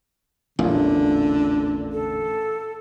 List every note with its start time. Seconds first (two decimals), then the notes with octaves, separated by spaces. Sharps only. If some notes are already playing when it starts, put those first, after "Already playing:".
0.59 A1 E2 A#2 D3
1.92 A4